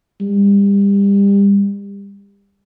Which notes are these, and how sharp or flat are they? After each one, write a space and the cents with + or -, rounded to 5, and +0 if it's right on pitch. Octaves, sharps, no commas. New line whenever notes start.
G3 +30